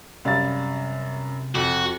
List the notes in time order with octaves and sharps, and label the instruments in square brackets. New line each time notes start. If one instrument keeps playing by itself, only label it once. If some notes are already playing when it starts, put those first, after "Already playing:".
[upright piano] F#2 A6 [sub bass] C3 [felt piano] G3 F5
[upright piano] F2 [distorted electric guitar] F#4